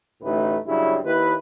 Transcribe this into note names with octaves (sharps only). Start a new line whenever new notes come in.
A1 D2 A2 A3 D#4 B4
G2 C#3 F#3 G3 E4
D#2 E4 B4